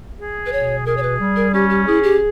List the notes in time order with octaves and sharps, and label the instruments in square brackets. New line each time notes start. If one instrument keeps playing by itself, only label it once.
[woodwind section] G#4
[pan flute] B4
[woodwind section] B2 [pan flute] C#5
[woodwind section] G#4 [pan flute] A#4
[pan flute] C#5
B4
[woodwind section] G3
[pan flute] A#4
[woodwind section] C#4 [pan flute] G4
[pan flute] G4
[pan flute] E4 [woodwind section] G#4
[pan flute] G4